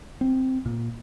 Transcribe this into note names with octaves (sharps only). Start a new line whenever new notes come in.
C4
A#2